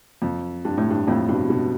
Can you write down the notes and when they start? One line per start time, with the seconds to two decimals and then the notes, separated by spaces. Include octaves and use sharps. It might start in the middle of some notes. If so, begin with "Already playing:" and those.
0.22 F2
0.65 G2
0.77 A2
0.91 G2
1.07 F2 A2
1.28 G2 B2
1.50 G2 B2